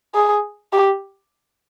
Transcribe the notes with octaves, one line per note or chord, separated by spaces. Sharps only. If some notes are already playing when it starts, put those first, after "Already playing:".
G#4
G4